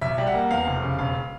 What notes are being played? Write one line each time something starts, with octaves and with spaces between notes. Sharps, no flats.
B1 E5
G3
F#5
A#3
E2 F5
F1
C#3
E1 F5